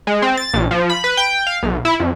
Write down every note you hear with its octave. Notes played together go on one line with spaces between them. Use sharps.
G#3
C4
A6
A#1
F3
B5
B4
G5
F5
B1
E4
F2